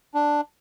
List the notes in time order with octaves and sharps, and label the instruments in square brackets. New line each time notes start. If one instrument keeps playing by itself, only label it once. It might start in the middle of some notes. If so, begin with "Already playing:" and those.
[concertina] D4